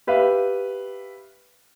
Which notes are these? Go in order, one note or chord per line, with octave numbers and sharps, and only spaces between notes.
G4 B4 E5 F5